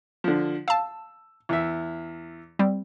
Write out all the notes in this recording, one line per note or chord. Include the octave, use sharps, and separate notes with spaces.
D3 F3
F5 A5 E6
E2 E5
G3 C4